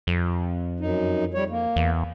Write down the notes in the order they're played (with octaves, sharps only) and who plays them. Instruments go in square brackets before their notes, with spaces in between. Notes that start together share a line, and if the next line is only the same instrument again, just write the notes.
[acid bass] F2
[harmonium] F#2 D#4
G3 C#5
A#3
[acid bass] E2